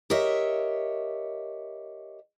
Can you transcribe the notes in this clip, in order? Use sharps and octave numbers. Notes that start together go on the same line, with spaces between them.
G4 A#4 C#5 D#5 E5